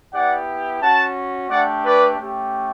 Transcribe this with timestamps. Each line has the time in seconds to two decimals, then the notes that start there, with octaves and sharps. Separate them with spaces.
0.13 B3 E4 G4 D5 F#5
0.81 C#4 F#4 F#5 A5
1.49 A3 D4 G4 D5 F#5
1.84 B4 D5
2.19 A3 C#4 G4